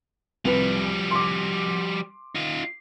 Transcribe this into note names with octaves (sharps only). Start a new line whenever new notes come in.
C2 F3 G3 B4
C6 D6
D#4 F4